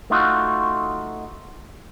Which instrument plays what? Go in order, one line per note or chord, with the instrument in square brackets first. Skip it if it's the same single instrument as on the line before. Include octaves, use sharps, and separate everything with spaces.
[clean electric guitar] A3 D#4 F4 F#4